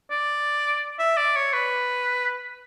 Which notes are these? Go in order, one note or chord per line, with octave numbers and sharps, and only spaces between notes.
D5
E5
D5
C#5
B4